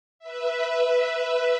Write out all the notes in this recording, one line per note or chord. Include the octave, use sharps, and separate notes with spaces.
B4 E5